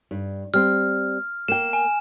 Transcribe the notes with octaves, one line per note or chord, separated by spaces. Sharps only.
G2
G3 C4 F6
A#3 G5 E7
G#5